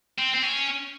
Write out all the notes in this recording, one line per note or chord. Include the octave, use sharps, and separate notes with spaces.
C4
C4
C#4